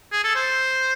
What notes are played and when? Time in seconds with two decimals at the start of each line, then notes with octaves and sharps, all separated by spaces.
0.12 G#4
0.24 A4
0.35 C5